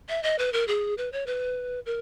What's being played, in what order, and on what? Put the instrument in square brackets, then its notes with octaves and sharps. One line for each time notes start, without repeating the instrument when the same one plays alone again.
[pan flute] E5
D#5
B4
A#4
G#4
B4
C#5
B4
A#4